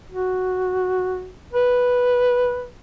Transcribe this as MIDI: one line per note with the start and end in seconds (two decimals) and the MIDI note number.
0.11 1.30 66
1.53 2.67 71